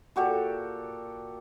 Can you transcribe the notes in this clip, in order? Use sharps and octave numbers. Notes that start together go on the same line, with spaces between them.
A#2 F#4 G4 A4